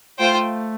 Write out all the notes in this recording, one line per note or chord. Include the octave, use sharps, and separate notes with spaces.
A3 F4 C5 G5